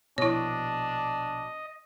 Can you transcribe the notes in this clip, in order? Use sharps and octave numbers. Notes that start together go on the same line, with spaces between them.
A#1 B2 D4 E4 C#5 D#5